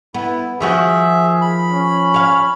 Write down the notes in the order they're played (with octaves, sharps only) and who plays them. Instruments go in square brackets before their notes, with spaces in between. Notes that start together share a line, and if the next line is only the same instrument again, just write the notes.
[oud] B3 [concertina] E4
[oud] D#3 F3 F#4 [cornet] G#4 [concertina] E5
[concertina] B5
[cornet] C#4
[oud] C#5 F5